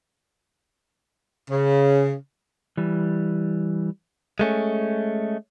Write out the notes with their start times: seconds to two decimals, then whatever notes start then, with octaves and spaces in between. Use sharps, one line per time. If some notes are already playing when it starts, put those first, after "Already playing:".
1.51 C#3
2.77 E3 G3
4.39 G#3 A3 C#4